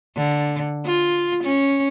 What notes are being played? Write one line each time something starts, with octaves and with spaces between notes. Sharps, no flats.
D3
F4
C#4